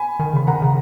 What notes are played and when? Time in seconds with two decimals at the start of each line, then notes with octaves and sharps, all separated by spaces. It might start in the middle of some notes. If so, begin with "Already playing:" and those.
Already playing: G#5 B5
0.19 D#3
0.33 C#3 B5
0.47 D#3 F#5 A#5
0.62 C#3